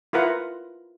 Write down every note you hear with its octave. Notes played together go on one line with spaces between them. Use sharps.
E4 F4 A#4 B4 F#5